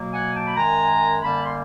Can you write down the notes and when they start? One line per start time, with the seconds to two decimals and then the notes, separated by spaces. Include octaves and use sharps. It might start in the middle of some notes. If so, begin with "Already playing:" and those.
Already playing: B2 F#3 A#3
0.12 F#5 G#5
0.34 G5 A5
0.47 B5
0.56 F#2 D#3 G#3 G#5 A#5
1.22 F#2 D3 G3 A#3 A5 B5
1.44 C6